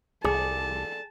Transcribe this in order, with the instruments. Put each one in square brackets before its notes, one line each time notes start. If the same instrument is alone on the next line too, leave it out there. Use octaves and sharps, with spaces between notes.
[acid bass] C2 [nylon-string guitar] G#4 [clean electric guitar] A4 D5 [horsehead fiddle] A5